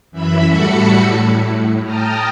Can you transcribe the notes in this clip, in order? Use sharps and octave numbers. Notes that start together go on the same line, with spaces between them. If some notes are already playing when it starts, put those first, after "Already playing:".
F#2 E3 E5 B5
A2 G3 F#4 A4 B5 C#7
A2
G5 A5 A#5 D#6 F6